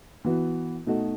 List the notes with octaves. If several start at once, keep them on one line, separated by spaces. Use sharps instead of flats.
E3 B3 F#4
B2 A3 D#4 F#4